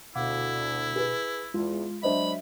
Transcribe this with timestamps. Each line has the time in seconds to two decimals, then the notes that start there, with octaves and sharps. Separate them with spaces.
0.16 D2 B2 D3 E4 F5 F#5 D6
0.96 G#4 B4
1.54 E2 G#3 F4
2.03 F#3 D4 C5 D#5 E5 B5